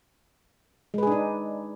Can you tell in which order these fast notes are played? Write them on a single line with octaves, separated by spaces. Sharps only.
G#3 B4 G#4 D4 D#4